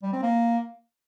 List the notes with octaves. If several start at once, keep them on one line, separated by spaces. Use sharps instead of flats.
G3
C4
A#3